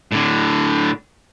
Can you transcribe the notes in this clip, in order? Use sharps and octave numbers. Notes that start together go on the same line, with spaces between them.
A2 D3